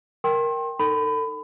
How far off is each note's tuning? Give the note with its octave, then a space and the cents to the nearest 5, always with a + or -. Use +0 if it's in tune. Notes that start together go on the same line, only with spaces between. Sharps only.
A#4 +5 G5 +0 C6 +35
D#4 +0 A4 +30 B5 +25